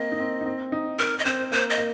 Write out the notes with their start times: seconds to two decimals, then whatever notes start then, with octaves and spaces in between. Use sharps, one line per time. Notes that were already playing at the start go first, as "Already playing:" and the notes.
Already playing: A#3 C4 D#5
0.12 D#4
0.20 C4
0.41 D#4
0.46 C4
0.72 D#4
0.99 D#4 A#4
1.19 D#5
1.25 C4 C5
1.52 A#3 C5
1.70 D#5
1.78 A#3